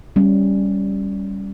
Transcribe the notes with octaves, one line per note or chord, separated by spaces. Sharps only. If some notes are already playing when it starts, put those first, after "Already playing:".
G3 C#4